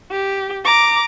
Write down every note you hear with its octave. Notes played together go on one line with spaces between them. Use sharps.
G4
A#5 D6